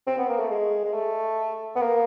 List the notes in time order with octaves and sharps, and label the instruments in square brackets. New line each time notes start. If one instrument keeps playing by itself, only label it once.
[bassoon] C4
B3
A#3
A3
G#3
G#3
A3
B3
A#3